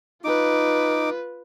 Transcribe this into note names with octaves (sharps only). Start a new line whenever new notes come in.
D#4 F4 B4 D6